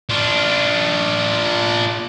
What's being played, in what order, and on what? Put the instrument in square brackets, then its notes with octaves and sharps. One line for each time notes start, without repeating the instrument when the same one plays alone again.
[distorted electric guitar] D4 F4